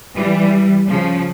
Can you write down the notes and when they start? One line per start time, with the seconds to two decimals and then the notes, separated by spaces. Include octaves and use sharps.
0.16 E3 G3
0.89 C#3 F3